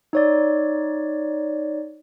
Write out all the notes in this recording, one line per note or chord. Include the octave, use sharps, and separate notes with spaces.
D#4 C#5 D5